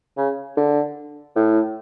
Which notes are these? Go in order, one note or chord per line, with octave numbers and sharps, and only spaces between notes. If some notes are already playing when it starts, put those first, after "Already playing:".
C#3
D3
A2